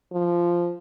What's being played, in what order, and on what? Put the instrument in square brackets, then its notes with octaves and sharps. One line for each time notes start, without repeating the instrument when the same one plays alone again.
[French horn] F3